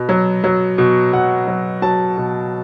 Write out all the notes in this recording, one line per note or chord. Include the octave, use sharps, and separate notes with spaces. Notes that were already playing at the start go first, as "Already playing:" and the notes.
Already playing: B2
F#3
F#3
B2
B2 F#5
F#3
F#3 A5
B2